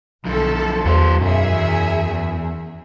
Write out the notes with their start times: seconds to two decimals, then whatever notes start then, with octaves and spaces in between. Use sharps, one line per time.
0.25 B1 D3 F3 A4
0.85 E2 F#3 C5
1.21 B1 F#2 G#4 E5
1.52 E2